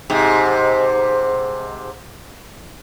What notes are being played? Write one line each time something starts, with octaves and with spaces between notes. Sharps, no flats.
G#2 C3